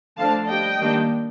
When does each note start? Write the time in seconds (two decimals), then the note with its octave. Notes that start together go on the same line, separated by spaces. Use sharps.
0.18 D3 F3 A3 D4 F5 A5
0.49 G3 D4 D#5 G5
0.81 D#3 G3 A#3 D4